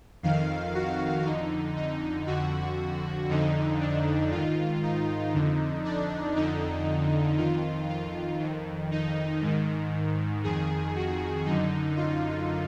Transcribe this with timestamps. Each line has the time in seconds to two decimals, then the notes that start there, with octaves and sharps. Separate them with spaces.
0.23 F2 D#3 F5
0.75 F#4
1.25 F2 D3 D#4
1.76 D#4
2.27 F2 D3 F#4
3.29 F2 D3 D#4
3.80 D4
4.31 G#2 D#3 F4
4.83 D#4
5.34 F2 D3
5.85 D4
6.36 F2 D3 D#4
7.38 F2 D#3 F4
7.89 F4
8.40 F2 D#3
8.91 D#4
9.42 G#2 D#3
10.44 F2 D#3 G#4
10.96 F#4
11.46 F#2 D3 D#4
11.97 F4